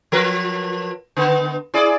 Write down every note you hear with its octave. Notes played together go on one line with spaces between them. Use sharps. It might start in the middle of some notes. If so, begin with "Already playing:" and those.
F3 A#4 B4
D3 B3
E4 G#4 D5